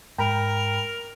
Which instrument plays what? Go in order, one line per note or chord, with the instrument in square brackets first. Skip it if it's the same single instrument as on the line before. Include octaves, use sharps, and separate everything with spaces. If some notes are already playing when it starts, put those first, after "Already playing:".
[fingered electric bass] G#2 [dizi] A#4 [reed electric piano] G5 A#5 B5